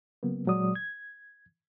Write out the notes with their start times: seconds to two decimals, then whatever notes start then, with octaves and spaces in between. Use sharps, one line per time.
0.23 C#3 F#3 A#3 B3
0.47 A#2 F#3 G#3 D5 D#6
0.75 G#6